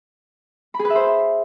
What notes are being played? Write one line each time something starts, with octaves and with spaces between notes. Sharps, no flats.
B5
G#4
B4
E5
C5